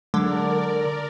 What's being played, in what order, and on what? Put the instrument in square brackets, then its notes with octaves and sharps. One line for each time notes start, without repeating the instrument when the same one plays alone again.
[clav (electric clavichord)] D3 [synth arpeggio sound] F#3 G#3 D4 [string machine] A#4 D5